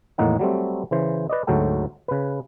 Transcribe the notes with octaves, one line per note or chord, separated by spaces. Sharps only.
E2 A2 D#3 A#3 D#4 F#5
F#3 G3 A3 C4
C#3 E3 C5
B4 D5 D#5
D2 G#2 F#3 A3 A4 G5
C#3 B4